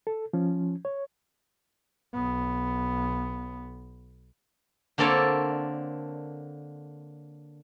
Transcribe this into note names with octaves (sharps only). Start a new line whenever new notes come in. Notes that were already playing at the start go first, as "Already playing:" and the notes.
A4
F3 C#4
C#5
B1 B3
D3 A#3 C4 A4 C#5 D5